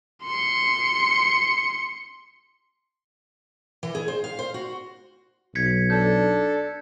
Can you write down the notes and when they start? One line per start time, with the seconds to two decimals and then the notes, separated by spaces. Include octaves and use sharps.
0.24 C6 C#7
3.83 E3
3.95 G#4
4.08 C5
4.24 F5
4.39 C5
4.54 F#4
5.55 B1 G#6 B6 C#7
5.90 D4 A4 G6